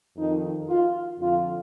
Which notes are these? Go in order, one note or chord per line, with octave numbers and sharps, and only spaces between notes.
F2 D#3 D#4
F4
F2 D3 F4